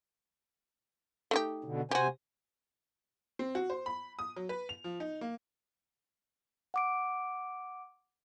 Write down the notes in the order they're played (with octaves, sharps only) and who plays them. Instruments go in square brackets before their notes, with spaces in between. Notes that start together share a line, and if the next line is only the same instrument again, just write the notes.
[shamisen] A3 D#4 G4
[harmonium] B2 D3
[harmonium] C3 C5 G#5 [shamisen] F#4 G4
[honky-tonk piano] C4
F#4
C5
B5
D#6
F#3
B4
F7
F3
D#4
A#3
[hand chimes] F#5 D6 D7